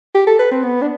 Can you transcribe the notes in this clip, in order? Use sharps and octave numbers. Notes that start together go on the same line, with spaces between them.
G4
A4
B4
C4
B3
D4